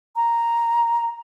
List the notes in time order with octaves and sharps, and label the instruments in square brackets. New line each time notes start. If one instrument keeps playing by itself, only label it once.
[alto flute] A#5